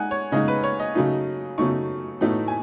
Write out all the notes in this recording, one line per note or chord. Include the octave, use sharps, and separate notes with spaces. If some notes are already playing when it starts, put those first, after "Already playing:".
Already playing: G#3 D#4 F#5 G#5
C#5
C#3 G#3 D#4 D#5
B4
C#5
D#5
C#3 F#3 A3 D#4
C#3 F#3 A3 D#4 C#6
A2 E3 A3 D#4 F#4
G#5